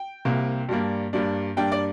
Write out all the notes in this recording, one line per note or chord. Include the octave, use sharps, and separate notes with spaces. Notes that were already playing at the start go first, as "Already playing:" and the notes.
Already playing: G5
C2 C3 A#3
G2 G3 A#3 D4
G2 G3 A#3 D4
G2 G3 A#3 D4 G5
D5